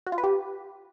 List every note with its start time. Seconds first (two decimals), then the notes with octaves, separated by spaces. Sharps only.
0.07 F#4
0.12 F4
0.18 B4
0.24 G4